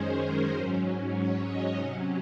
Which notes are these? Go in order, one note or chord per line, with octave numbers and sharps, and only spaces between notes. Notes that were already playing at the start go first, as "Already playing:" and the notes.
Already playing: F#2 D#3 G#3 C#4 G#4 C5
A#4
G#2 F#3 C#4 C5
C#5
D#5
C3 F#3 C#4